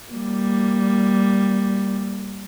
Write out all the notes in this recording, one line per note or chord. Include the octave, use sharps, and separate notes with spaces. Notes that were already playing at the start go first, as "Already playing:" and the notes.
G3 A#3